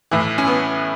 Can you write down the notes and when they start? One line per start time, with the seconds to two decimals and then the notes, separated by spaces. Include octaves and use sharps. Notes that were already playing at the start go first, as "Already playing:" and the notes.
0.11 A2 E3 E4
0.38 C#4
0.47 B3